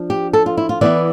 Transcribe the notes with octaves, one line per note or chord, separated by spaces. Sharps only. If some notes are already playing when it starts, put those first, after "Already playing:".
Already playing: F3 D4
G4
A4
F4
E4
F4
E3 B3 E4 D5